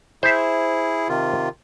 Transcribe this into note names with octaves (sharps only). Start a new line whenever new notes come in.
E4 G#4 C5 E5
C3 D#3 F4